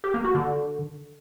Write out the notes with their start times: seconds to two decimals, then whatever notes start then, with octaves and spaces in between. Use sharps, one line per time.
0.04 G4
0.14 A#3
0.24 F#4
0.35 D3